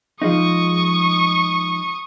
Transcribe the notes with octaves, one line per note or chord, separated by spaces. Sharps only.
F3 G#3 D#4 C#6 D#6